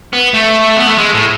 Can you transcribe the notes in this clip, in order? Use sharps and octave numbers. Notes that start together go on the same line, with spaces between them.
B3
A3
B3
A3
G#3
A2